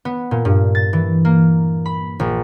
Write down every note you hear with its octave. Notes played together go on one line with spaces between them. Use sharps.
B3
A#2
G2
A6
E3
A#3
B5
A#1